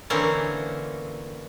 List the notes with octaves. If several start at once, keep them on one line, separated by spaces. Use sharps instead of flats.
D3 E3 A#3 C4 C#4